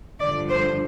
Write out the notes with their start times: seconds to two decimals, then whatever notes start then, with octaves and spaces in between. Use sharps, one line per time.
0.19 G2 D3 F3 D5
0.49 C5